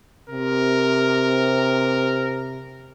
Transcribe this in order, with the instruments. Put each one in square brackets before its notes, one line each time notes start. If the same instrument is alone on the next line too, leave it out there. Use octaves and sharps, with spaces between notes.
[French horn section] C3 [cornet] A#4